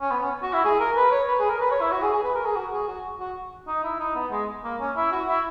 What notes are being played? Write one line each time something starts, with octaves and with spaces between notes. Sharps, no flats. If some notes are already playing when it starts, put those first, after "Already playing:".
C#4
B3
C#4
F#4
E4
G#4
A#4
B4
C#5
B4
G#4
A#4
B4
C#5
E4
F#4
G#4
G#4
B4
A#4
G#4
F#4
G#4
F#4
F#4
D#4
E4
D#4
B3
G#3
A#3
C#4
E4
F#4
E4